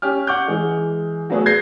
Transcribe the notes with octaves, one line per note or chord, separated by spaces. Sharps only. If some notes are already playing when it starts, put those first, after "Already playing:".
C#4 G4 F6
F#5 C#6 D6 G6
E3 G#3
F#3 A3 B3 G#4
G6 G#6 A#6 C7